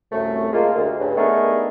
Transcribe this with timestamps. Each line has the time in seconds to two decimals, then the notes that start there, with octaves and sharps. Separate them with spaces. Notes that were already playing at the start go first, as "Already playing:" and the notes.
0.12 C2 F#2 A3
0.52 G#3 A#3 F4
0.76 D2
1.00 G2 C#3
1.17 A3 B3 D4 D#4 G#4 A#4